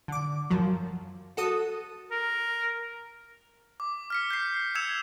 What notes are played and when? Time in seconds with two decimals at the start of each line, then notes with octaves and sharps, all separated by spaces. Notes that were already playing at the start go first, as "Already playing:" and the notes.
0.08 D3 D6
0.50 F#2 F3 F#3
1.37 F#4 A4 D#6
2.11 A#4
3.80 D6
4.10 F6 B6 C#7
4.30 G6 C7
4.75 E6 G#6 C#7 E7 F7